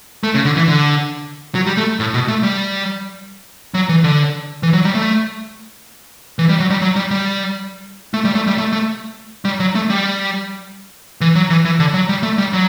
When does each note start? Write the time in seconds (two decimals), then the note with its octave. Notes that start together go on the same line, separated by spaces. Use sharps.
0.24 A3
0.34 C#3
0.45 D3
0.57 E3
0.68 D3
1.55 F#3
1.67 G3
1.77 A3
2.00 A2
2.14 B2
2.28 A3
2.43 G3
3.74 F#3
3.89 E3
4.04 D3
4.63 E3
4.73 F#3
4.85 G3
4.95 A3
6.39 E3
6.49 G3
6.60 F#3
6.70 G3
6.82 F#3
6.96 G3
7.11 G3
8.14 A3
8.25 G3
8.35 A3
8.47 G3
8.58 A3
8.73 A3
9.45 G3
9.60 F#3
9.75 A3
9.90 G3
11.21 E3
11.35 F#3
11.50 E3
11.65 E3
11.79 D3
11.94 F#3
12.09 G3
12.23 A3
12.38 G3
12.53 F#3